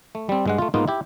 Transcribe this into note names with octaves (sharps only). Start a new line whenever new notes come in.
A3
G3 C4
G2 G#3 F#5
A3 F4
G#2 A#3 B3 D#4 F4
E4 G4